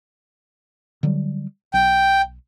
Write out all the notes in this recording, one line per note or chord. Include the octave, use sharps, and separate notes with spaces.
D3 F#3 G3
B1 G5